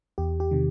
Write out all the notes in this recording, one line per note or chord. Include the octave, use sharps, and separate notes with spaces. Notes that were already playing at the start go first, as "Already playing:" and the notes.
E2 G4
G4
C3 D#3